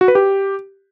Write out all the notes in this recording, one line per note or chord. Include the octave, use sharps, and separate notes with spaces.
F#4
B4
G4